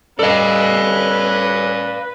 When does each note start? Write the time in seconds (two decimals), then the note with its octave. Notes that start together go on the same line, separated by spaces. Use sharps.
0.19 G3 C#4 A4 B4 D5 D#5 F5